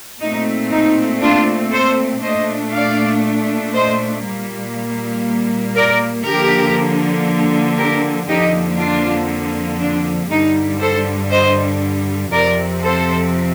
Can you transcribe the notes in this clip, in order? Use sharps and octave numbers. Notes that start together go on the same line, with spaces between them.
A#2 A3 C4 D#4
D#4
D4 F4
A4 C5
A#2 A3 D4 C5 D#5
D5 F5
C5 D#5
A#2 G3 A#3
A#4 D5
D3 F3 A#3 G4 A#4
G4 A#4
F2 D3 F3 A#3 D#4 G4
D4 F4
D4
G2 D3 G3 D#4
A4 C5
C5 D#5
F2 C3 F3 C4 A#4 D5
A4 C5